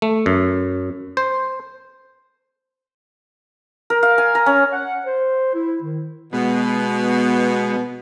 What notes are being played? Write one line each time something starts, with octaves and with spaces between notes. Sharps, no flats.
A3
F#2
C5
A#4
F5
G#5
A#5
C#4
F#5
C5
E4
D#3
B2 G#3 B3